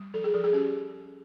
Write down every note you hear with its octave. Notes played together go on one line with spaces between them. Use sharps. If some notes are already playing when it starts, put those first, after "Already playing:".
Already playing: G3
F3 A4
G#4
F3 A4
G#4
C#4 G4